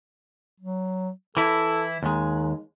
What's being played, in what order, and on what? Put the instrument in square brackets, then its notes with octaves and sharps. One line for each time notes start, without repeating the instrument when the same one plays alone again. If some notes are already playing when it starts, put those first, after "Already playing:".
[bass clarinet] F#3
[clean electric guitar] E3 E4 [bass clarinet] A4
[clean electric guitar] D#2 G#3 [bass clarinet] D#4